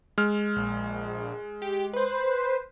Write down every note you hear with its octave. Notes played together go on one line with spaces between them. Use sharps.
G#3 F6
A#1
G4
B4 C5